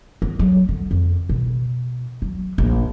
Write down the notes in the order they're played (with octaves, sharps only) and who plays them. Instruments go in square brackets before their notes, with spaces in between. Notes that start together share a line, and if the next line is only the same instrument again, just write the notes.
[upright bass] B3
F#3
D3
F2
B2
F#3
A#1